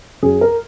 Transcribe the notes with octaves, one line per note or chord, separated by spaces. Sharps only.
F#2 G#4
A#4